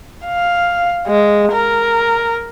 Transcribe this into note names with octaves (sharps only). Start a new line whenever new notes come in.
F5
G#3
A#4